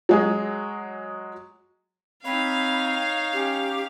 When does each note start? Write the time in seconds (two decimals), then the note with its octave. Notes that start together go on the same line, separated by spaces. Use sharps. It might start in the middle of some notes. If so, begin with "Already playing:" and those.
0.09 F#3 G#3 G#4
2.25 C4 D#4 C#5 F5 B5
3.33 C#4 G4